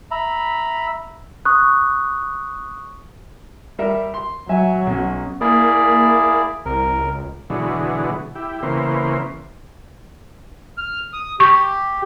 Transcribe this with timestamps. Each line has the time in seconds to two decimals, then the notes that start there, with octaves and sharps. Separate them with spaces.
0.11 E5 A#5 B5
1.45 C#6 D#6 F#6
3.79 G3 A#4 E5
4.14 C6
4.49 F#3 E5 G#5
4.87 B1 C#4
5.41 A#3 E4 G#4 D5
6.66 C2 A#4
6.98 C#2
7.50 B2 D3 E3 F#3 G#3
8.35 E4 G4
8.63 C#3 E3 A#3 B3 C5
10.78 F6
11.13 D#6
11.40 G4 C#6